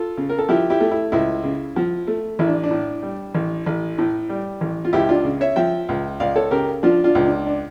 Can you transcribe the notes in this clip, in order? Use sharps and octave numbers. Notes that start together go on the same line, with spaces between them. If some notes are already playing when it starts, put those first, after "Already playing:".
Already playing: F4 A4
C#3
A#4
A4
F3 E4 G4
E4 G4
A3
E4
C#2 E4
C#3
F3
A3
A1 E4
D4
D4
A2
G3
A1
A1
A2
G3
A1
F4
C#2 E4 G4
D4 F4
C#3
C#5 E5
F3 E5 G5
C#2
C#2 D5 F5
A4 C#5
C#3 G4 A#4
F3 D4 F4
D4 F4
C#2
D4
D4